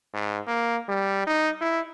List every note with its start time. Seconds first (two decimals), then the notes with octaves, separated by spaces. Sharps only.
0.14 G#2
0.47 A#3
0.89 G3
1.26 D#4
1.61 E4